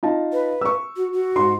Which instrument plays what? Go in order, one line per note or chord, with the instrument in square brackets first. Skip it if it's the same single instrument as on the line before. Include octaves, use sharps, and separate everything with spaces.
[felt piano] D#4 F4 A5
[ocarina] B4
[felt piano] C#6 E6
[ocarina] F#4
F#4
[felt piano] G#2 C6